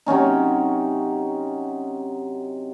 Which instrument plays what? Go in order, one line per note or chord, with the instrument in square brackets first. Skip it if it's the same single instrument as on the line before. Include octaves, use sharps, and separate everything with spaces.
[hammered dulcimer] C3 F#3 C#4 D#4